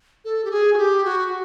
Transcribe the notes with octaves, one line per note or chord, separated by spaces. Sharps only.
A4
G4
G#4
F#4
G4
F#4